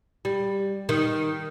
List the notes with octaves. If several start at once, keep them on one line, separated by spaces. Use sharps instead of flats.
G3
D#3